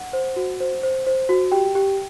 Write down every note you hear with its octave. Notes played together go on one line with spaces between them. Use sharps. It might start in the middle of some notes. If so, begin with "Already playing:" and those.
Already playing: F#5
C5
F#4
C5
C5
C5
F#4
G4 G5
G4